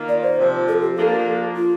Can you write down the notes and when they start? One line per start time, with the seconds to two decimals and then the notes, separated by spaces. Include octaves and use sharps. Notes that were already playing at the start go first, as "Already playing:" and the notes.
Already playing: D#3 A#3 F4
0.09 D5
0.23 C5
0.38 C3 F3 C4
0.68 A4
0.82 G4
0.97 F3 A#3 D4 A4
1.56 F4